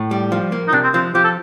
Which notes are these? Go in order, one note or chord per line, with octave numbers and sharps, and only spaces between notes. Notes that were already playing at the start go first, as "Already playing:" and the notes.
Already playing: A2
G3
F3
A#3
D#4
C3 D4
C4
F3 C4
F3 G4
A4